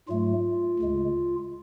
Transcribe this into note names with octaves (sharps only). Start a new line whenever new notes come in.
G#2 F#3 A3 F4
D2 C#3 G#3